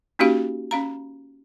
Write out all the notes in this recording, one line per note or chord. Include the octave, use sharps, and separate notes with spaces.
A#3 C#4 D#4 F#4 G4 F5
C#4 F5 A#5